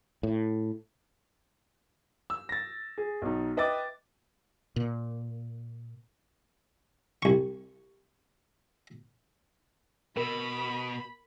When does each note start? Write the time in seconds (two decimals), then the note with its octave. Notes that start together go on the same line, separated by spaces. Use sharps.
0.23 A2
2.30 E6
2.49 A6 A#6
2.98 G#4
3.22 B1 D#4
3.57 B4 D#5 E5 G5 D6 A6
4.76 A#2
7.23 C2 C#6
10.17 B2 A#4 B5